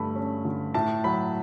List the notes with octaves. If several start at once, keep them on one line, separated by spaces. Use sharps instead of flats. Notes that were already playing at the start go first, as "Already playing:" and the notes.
Already playing: G2 D3 A3 B5
C#4
D3
A2 A5
F#3 B5